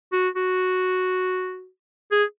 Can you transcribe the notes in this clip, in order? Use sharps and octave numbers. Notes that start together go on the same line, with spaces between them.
F#4
F#4
G#4